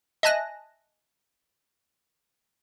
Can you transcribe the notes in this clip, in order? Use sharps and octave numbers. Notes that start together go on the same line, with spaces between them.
D#5 E5 G#5 A5 F#6 A#6